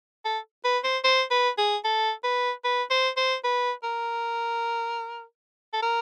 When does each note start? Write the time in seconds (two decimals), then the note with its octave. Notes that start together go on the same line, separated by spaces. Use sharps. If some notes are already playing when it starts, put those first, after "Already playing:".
0.25 A4
0.64 B4
0.84 C5
1.04 C5
1.31 B4
1.58 G#4
1.84 A4
2.24 B4
2.64 B4
2.90 C5
3.17 C5
3.44 B4
3.83 A#4
5.73 A4
5.82 A#4